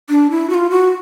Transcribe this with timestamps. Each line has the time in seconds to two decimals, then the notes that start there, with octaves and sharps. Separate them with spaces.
0.10 D4
0.30 E4
0.49 F#4
0.54 F4
0.70 F#4